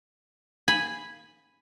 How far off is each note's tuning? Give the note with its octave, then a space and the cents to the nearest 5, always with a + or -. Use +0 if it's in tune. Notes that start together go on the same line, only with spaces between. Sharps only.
G#5 -5 B5 +0